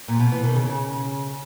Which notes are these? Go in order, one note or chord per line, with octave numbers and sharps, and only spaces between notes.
A#2
B2
E3
D#3
C#3